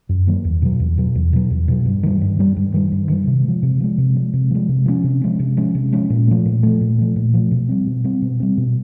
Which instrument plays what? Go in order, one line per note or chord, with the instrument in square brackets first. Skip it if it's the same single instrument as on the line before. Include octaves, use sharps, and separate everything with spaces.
[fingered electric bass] F#2
D#3 F#3 A#3
E2
B2 F#3
E2
B2 F#3
E2
B2 F#3
E2
B2 F#3
G2
D#3 G3
G2
D#3 G3
G2
D#3 G3
G2
D#3 G3
C3
F3 G#3
C3
F3 G#3
C3
F3 G#3
C3
F3 G#3
C3
F3 G#3 C#4
C3
F3 G#3 C#4
C3
F3 G#3 C#4
C3
F3 G#3 C#4
A#2
F3 A3
A#2
F3 A3
A#2
F3 A3
A#2
F3 A3
B2
G3 C4
B2
G3 C4
B2
G3 C4
B2